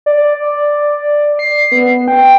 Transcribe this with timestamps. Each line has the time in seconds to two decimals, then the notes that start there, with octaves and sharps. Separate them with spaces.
0.06 D5
1.39 C7
1.72 B3
2.08 G5